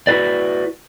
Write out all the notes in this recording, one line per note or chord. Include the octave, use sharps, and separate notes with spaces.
E4 F#4 B4 D5